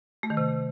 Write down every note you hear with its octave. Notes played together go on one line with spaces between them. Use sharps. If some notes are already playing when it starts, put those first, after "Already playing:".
A3
D#3
C3